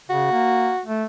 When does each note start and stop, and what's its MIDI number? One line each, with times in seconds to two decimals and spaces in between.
0.10 0.31 49
0.10 0.80 66
0.32 0.71 58
0.86 1.05 57